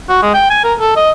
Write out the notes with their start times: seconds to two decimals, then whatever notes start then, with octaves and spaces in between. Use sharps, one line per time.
0.09 F#4
0.22 G#3
0.34 G5
0.50 G#5
0.64 A#4
0.80 A4
0.96 D#5